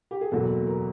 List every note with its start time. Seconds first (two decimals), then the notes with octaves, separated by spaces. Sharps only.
0.11 G4
0.21 G#4
0.31 F#1 E2 B2 F#3 A#3 A4
0.67 A#4